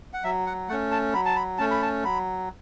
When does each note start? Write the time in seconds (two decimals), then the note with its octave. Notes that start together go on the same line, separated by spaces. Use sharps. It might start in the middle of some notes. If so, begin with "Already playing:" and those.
0.13 F#5
0.24 F#3 E5
0.46 F#5
0.69 A3 C#4 F#5
0.91 A5
1.14 F#3 B5
1.25 A5
1.36 B5
1.58 A3 C#4 A5
1.71 B5
1.82 A5
2.04 F#3 B5